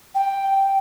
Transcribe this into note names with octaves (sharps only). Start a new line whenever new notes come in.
G5